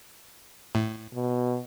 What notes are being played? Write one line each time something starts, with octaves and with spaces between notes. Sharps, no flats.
A2
B2